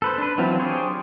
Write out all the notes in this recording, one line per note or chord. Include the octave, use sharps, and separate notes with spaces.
A4 B4 C5
D4 B4
E3 F#3 C4 F4
D4 G4 G#4 C5 C#5